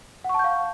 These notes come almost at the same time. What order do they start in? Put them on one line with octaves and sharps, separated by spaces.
F#5 C#6 A5 G6 F5